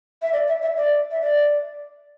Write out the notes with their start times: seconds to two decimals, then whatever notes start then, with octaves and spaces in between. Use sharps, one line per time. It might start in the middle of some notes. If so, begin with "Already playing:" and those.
0.22 E5
0.33 D5
0.47 E5
0.62 E5
0.77 D5
1.11 E5
1.21 D5